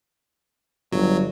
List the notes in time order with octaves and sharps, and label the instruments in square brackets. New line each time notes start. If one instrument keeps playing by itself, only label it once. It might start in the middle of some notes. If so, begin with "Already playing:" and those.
[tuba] G1 [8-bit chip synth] F#3